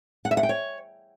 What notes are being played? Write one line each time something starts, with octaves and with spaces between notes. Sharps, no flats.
F#5
E5
F#5
G5
C#5